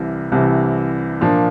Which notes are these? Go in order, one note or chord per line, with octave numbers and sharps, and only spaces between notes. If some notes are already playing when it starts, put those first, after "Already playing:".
Already playing: C2 C3 E3 G3
C2 C3 E3 G3
A#2 F3 A#3 D4